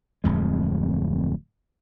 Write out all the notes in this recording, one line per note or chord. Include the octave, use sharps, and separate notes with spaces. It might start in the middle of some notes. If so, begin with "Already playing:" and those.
D1 F2 G#3